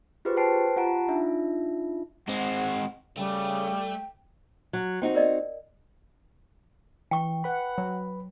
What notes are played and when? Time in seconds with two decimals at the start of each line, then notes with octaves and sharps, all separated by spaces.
0.25 F4 G4 G#4 B4 C5
0.37 B4 C5 G5 A5 C7 D7
0.76 F4 G4 F#5 A5 A#5 D7
1.08 D4 D#4 F4 E5
2.28 G#3 C4 F#5
3.17 C#3 G3 A3 G5
4.73 F#3
5.02 C4 D#4 F#4 G5
5.15 A#4 D5 D#5
7.11 E3 G5 C#6
7.44 B4 F#5 B5
7.78 F#3